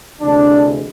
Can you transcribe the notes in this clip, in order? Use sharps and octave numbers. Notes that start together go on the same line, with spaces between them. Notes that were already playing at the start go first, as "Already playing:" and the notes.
D2 C3 E3 G#3 D4